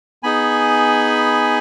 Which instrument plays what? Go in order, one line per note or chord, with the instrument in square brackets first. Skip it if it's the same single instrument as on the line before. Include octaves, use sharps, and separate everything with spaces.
[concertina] B3 D#4 G#4 G#5 B5